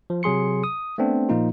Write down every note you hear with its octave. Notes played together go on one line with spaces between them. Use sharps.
F3
C3 F#3 G#4 C6 C#7
D#6
A3 B3 C4 D4
A#2 F3 A#3 D#4 F4